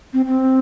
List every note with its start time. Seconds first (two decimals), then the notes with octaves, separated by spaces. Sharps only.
0.13 C4
0.26 C4